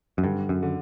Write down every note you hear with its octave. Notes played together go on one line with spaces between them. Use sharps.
F#2
G2 D3
F#2
D3